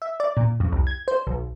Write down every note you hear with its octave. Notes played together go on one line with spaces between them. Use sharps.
E5
D5
A#2
F2
C2
G#6
C5
B1